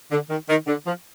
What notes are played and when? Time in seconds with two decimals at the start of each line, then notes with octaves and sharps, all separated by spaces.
0.11 D3
0.30 D#3
0.49 D#3
0.67 D3
0.86 F3